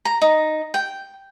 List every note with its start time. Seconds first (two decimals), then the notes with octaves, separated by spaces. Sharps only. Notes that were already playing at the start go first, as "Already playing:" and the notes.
0.05 A#5
0.22 D#4
0.74 G5